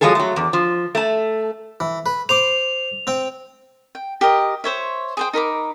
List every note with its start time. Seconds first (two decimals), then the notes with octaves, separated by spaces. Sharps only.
0.01 F3 F#3 G#3 G#4 A4
0.15 F#3 A3
0.36 E2
0.53 F3
0.95 A3 A5
1.80 E3
2.06 B4
2.29 C5 C6 D6 F7
3.07 C4 G5
3.95 G5
4.21 G4 A#4 D#5
4.64 C5 C#5 E5
5.17 G#4 C5 G5
5.33 D#4 A#4 B5 D6